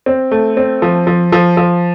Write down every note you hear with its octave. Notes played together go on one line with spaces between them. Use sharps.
C4
A3
C4
F3
F3
F3
F3